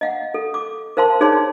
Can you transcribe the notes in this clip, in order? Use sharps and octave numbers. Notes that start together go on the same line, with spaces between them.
D#5 F5 F#5
A4
D6
A#4 C5 F5 A5 C6
D#4 G#4 C#5 D5 A5 C6